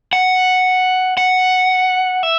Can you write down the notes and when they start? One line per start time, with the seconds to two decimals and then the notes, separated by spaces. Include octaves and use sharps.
0.13 F#5
1.17 F#5
2.23 E5